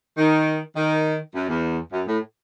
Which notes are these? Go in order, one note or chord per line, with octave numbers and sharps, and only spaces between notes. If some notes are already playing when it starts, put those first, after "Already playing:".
D#3
D#3
F#2
E2
F#2
A2